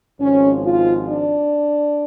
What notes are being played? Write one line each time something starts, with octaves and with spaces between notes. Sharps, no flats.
G#1 G#2 F3 G#3 C#4
F4
D4